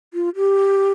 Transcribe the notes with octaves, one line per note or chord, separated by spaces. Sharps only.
F4
G4